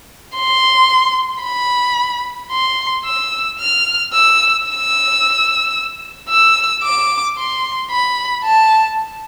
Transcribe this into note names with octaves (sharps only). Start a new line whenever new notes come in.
C6
B5
C6
E6
F6
E6
E6
E6
D6
C6
B5
A5